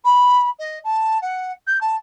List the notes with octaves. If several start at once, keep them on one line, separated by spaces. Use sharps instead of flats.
B5
D#5
A5
F#5
G6
A5